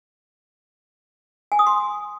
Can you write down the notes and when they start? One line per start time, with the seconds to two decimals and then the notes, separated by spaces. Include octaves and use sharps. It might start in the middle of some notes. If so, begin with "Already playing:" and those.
1.52 G#5
1.59 D#6
1.67 C6